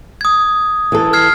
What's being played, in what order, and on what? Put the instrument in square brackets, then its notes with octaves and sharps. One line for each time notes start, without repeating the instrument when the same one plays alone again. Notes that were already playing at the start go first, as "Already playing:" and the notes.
[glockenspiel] D#6 G#6
[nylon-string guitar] E3 A4
[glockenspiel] F6 G#6 C7